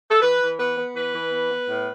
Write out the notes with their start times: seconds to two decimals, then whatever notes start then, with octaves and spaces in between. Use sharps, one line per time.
0.11 A4
0.22 E3 B4
0.41 E3
0.59 B3 B4
0.78 B3
0.95 E3 B4
1.14 E3
1.33 B3
1.52 B3
1.70 A2